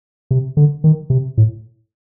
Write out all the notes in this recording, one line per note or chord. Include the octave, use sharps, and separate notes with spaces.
C3
D3
D#3
C3
A2